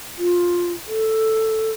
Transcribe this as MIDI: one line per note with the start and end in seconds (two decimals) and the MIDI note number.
0.18 0.73 65
0.87 1.71 69